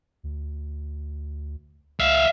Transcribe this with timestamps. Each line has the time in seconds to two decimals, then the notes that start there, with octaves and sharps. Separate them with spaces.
0.23 D2
2.00 C#2 E5 F5